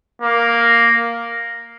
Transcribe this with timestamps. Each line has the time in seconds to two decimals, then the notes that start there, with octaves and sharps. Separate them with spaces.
0.22 A#3